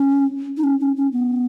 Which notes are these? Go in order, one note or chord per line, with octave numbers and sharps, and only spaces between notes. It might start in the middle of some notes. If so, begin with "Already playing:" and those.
Already playing: C#4
D#4
C#4
C#4
C#4
B3